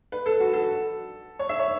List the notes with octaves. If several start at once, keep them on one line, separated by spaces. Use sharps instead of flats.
B4
A4
F#4
A4
C#5
E5
C#5